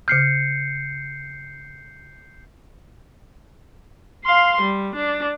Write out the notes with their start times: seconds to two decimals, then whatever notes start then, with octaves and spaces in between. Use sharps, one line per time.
0.08 C#3 F6 G6 C7 C#7
4.25 F5 C6
4.61 G3
4.96 D4